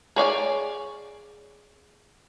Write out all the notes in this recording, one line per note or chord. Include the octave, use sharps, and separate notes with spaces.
G#4 C#5 D5 G#5